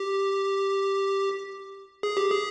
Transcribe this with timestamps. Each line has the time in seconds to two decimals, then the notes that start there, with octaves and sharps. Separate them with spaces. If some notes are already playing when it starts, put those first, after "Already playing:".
Already playing: G4
2.03 G#4
2.17 G4
2.30 G#4